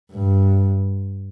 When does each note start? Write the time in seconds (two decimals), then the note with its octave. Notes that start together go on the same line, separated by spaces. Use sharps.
0.12 G2